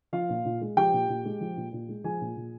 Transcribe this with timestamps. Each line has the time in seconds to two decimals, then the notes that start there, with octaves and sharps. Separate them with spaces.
0.13 F3 F4 F5
0.29 A#2
0.45 A#2
0.61 G#3
0.77 F3 G4 G5
0.93 A#2
1.09 A#2
1.25 G#3
1.41 F3
1.57 A#2
1.73 A#2
1.89 G#3
2.04 F3 G#4 G#5
2.21 A#2
2.36 A#2